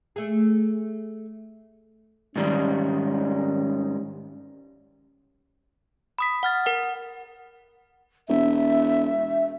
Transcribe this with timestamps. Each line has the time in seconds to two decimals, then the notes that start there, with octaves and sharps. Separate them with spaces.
0.16 A3 G#4
2.36 G#2 D#3 G3 C#4
6.19 B5 D#6 B6
6.43 F#5 F6 A6
6.66 A#4 F#5
8.29 E1 E5